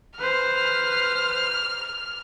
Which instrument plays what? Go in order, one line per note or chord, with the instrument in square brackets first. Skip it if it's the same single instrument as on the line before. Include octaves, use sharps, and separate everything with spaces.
[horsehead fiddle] B4 C5 [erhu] F6